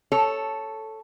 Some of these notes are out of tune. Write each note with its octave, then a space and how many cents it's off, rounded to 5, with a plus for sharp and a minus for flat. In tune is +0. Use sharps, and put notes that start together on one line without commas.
A4 +0 C#5 +0